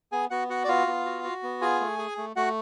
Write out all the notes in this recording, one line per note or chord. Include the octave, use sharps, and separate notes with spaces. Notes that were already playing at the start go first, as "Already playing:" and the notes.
B3 G#4 G#5
B3 F#4 F#5
F#4 F#5
D5
B3 F4 F5
B3
F#4
F#4
B3
F4 G#4 G#5
A3
G#4
A3
A3 F#4 F#5